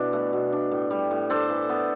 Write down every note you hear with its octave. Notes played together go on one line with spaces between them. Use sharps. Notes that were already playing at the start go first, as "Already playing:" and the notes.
Already playing: B2 E3 D4 B4
A3
B2
D4
A2
G3
A2
D4 A4 C5
E3
B3